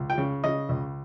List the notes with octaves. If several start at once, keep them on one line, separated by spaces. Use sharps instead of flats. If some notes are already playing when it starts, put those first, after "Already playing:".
Already playing: C#2
G5
C#3
C#3 D#5
C#2